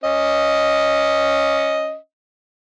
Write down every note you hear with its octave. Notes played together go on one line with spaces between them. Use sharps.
C#4 D#5